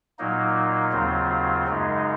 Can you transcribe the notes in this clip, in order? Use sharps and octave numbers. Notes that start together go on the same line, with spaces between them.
A#2 F#3 A#3 D#4
D#2 C#3 F#3 C4 F4
F#2 C#3 G#3 D#4